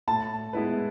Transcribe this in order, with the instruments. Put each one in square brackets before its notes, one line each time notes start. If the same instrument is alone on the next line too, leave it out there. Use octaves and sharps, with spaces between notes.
[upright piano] A2 [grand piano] A5
[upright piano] G#3 B3 E4 B4